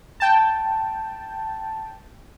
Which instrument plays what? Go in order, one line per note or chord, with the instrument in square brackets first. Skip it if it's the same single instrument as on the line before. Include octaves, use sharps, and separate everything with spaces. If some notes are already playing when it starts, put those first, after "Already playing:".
[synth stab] G5 A5